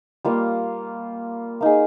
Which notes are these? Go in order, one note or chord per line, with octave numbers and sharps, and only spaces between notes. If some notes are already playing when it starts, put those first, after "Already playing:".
G3 A#3 F4
A#3 D#4 G#4